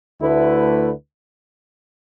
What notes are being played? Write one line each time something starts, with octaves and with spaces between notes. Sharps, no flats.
D2 D3 A3 E4 B4